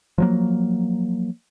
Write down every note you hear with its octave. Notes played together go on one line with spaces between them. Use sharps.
F3 F#3 A#3